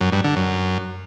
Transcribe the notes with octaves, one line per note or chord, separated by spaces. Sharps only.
F#2
G2
D3
F#2